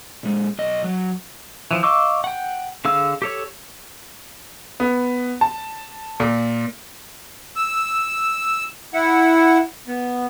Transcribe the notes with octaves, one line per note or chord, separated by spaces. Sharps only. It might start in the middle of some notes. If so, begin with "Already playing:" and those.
A#2 G#3
B1 D#5
F#3
E3 F3
D#5 F5 C#6 D6 E6
F#5 G5
D3 G#4 F5 E6
G4 A4 C#5
B3
A5
A#2
E6
E4 F#5
B3